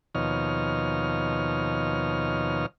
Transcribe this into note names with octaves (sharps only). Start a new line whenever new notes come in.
D#2 B2 F3 C#5 D#5 F6